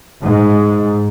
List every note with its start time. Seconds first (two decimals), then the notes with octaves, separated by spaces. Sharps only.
0.23 G#2